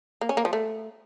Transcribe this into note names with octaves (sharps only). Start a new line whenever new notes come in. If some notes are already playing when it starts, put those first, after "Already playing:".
A#3
C#4
A#3
F3
A3